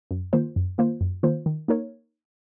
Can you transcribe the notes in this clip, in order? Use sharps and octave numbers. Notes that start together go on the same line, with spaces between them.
F#2
D#3 A#3 F4 C5
F#2
D#3 A#3 F4 C5
F#2
D#3 A#3 F4 C5
D#3
A#3 D#4 A#4 C#5